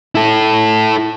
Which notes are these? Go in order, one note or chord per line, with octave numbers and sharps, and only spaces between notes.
E4 A4